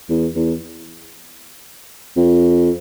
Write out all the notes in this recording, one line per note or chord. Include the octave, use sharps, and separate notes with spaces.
E2
E2
F2